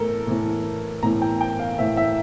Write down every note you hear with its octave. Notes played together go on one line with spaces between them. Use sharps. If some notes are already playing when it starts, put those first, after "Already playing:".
Already playing: A2 E3 A4 A#4
A2 E3
A2 E3 A#5
G5
G5
F5
A2 E3 E5
E5